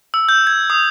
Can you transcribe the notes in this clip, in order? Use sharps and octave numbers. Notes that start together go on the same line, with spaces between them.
E6
G6
G#6
D#6